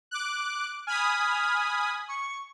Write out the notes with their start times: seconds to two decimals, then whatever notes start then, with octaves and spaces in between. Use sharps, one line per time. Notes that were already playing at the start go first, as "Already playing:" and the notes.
0.11 D6 F#6
0.87 G#5 B5 D#6 F6
2.08 C#6